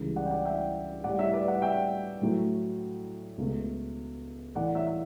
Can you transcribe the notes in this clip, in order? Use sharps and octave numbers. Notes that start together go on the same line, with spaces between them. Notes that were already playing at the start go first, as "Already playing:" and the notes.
Already playing: C#2 C#3 E3 G3
D5 F#5
G5
D5 F#5
E5 G5
A2 G3 D5 F#5
C#5 E5
B4 D5
D5 F#5
E5 G5
A2 F#3 A3
C#2 B2 A3
A2 E3 A3 D5 F#5
C#5 E5
E5